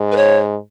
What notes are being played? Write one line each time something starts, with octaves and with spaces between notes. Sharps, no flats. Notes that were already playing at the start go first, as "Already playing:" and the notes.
Already playing: G#2
B4
C#5